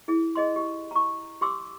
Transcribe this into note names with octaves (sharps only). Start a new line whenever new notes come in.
E4 G#4
G#4 D#5 C6
G4
A#5 C#6
G4 C6 D6 E6